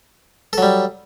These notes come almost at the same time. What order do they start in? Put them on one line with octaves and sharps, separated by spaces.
A4 F#3 G3